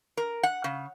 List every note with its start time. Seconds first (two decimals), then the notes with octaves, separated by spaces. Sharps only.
0.17 A#4
0.43 F#5
0.64 C#3